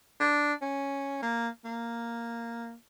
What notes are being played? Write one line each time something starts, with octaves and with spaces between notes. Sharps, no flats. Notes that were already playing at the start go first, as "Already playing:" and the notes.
D4
C#4
A#3
A#3